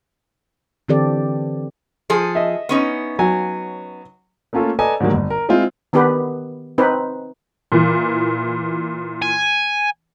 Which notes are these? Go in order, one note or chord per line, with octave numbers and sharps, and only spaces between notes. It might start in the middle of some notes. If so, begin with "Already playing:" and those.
D3 E3 C4 G4 A4 D5
F3 G#4 A4
D#5 E5
B3 C#4 D#4
F#3 G#5
A3 A#3 C#4 F4 A4
A4 B4 D5 D#5 G#5 A#5
G#2 D3 D#3 F#3 G3 A#3
G1
A#4
G#3 C4 E4 F4
D#3 B3 D4 G4 B4
C4 D#4 B4
A#2 E3
G#5